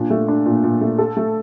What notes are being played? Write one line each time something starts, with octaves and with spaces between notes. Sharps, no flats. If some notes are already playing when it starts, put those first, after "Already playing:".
Already playing: A#2 D4
A3
D4
A#2
A#2
A3
A4
A3